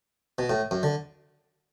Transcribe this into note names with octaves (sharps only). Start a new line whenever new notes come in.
B2
A2
F#2
D3